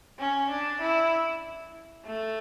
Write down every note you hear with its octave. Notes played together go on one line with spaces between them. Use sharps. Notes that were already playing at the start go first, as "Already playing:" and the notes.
C#4
D4
E4
A3